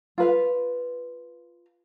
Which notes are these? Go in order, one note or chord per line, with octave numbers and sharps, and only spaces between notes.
F4 B4 F5